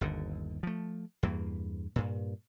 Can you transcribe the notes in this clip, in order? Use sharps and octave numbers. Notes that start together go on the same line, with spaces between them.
G1 D#2 D3
F3 A3
E2 G2 A#3
G2 A#2